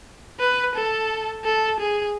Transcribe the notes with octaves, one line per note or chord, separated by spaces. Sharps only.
B4
A4
A4
G#4